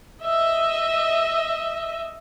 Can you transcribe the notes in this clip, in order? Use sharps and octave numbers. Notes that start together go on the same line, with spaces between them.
D#5 E5